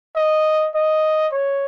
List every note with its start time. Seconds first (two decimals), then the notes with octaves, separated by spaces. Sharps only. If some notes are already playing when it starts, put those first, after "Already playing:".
0.16 D#5
0.75 D#5
1.32 C#5